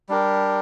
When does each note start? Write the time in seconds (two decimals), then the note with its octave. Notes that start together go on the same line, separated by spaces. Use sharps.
0.09 G3 D4 G4 A#4